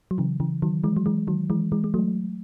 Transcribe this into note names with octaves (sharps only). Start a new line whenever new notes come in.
F#3
C#3 E3
C#3 E3
D#3 F#3
E3 G#3
F#3
E3 G#3
D#3 F#3
E3 G#3
E3 G#3
G#3
F#3 A3